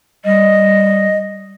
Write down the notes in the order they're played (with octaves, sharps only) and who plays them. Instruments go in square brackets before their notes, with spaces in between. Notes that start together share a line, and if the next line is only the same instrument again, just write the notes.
[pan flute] G3 [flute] D#5